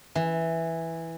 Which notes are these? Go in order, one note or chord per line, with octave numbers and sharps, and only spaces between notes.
E3